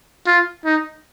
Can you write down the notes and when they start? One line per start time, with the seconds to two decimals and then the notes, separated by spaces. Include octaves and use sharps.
0.27 F4
0.65 D#4